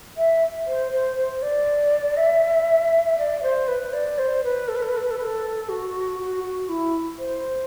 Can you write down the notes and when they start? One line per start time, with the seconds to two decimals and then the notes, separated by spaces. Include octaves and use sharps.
0.17 E5
0.67 C5
0.92 C5
1.17 C5
1.42 D5
2.17 E5
3.18 D5
3.42 C5
3.68 B4
3.93 D5
4.18 C5
4.44 B4
4.68 A4
4.75 B4
4.82 A4
4.89 B4
4.97 A4
5.03 B4
5.11 A4
5.18 B4
5.24 A4
5.69 F#4
6.19 F#4
6.44 F#4
6.69 E4
7.19 C5